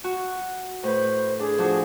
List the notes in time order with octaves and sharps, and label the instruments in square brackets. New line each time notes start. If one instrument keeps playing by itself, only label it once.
[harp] F#4
[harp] A2 B4 [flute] C5
[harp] D4 [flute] G#4
[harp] F3 D4 F#4